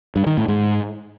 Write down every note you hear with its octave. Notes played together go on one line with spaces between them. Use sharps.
G2
D#3
A2
G#2